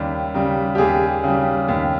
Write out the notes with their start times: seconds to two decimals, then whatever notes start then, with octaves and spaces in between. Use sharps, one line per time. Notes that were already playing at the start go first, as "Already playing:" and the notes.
Already playing: D#2 C#3 G3
0.34 C#3 G3
0.75 G4
0.78 D#2 G#4
1.24 C#3 G3
1.68 D#2